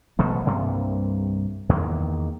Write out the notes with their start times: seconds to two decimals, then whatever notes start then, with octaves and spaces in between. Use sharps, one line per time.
0.19 A#1 B2 F#3 A3
0.46 C2 G2 C3 A#3
1.69 E2 D#3 A#3